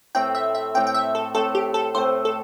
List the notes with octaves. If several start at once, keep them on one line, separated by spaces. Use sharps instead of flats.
A2 A3 C4 G5
E5
E5
A2 A3 C4 G5
G5
E5
A4
A2 A3 C4 A4
G4
A4
A2 A3 C4 C5
A4